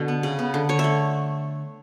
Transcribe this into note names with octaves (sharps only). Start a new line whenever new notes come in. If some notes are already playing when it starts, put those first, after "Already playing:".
Already playing: B2 D3
B3
C#3
B3
D3
D3 C#5
E5
A3